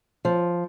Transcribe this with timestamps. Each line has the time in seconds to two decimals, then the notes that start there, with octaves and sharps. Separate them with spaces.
0.25 F3